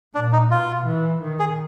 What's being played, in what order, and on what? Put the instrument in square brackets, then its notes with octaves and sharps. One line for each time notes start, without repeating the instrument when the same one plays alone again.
[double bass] A#2 [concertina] D4
[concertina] D#4
[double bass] B2 [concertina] F4
[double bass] E3
D#3
[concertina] G#4